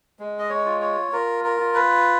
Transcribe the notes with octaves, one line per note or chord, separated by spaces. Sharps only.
G#3
D#5
C#5
F4
C#5
F4 A#4
A#4
F4
B4